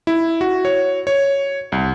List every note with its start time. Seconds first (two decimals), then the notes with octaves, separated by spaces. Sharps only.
0.07 E4
0.41 F#4
0.65 C#5
1.07 C#5
1.72 C2